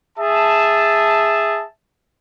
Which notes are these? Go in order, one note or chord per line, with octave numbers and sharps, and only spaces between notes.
G#4 E5 A5